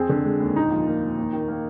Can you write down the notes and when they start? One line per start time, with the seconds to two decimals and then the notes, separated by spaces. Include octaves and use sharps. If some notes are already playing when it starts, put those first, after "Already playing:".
Already playing: F2 C4 G#4
0.09 D3
0.25 G#3
0.40 D#2
0.55 A#2 D#4
0.71 F3
0.87 A#3
1.02 A#2
1.18 D#2
1.33 D#3
1.48 A#3